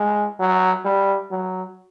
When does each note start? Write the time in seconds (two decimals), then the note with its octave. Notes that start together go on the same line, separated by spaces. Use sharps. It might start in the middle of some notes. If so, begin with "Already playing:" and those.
Already playing: G#3
0.40 F#3
0.85 G3
1.31 F#3